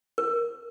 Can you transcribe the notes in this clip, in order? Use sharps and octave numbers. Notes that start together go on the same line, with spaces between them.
A#4